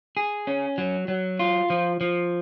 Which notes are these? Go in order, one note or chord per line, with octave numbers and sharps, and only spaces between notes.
G#4
C#4
F#3
F#3
F4
F3
F3